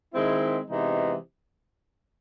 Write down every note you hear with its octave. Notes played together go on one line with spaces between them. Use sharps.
D#3 G#3 C4 E4
C3 E3 G#3 B3 D#4